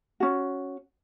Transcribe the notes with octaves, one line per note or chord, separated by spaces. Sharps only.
C#4 F#4